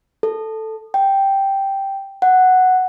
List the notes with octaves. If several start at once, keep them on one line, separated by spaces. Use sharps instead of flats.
A4
G5
F#5